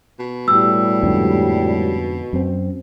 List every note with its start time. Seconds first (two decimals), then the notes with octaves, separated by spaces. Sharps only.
0.19 B2
0.48 A2 G3 E6
1.03 F2 G#2 D3
2.33 F#2 C4